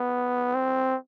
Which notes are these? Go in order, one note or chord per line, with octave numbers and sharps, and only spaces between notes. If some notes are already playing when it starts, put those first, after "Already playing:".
Already playing: B3
C4